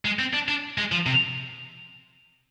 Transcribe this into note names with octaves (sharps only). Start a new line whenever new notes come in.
G#3
C4
D4
D4
G#3
F3
C3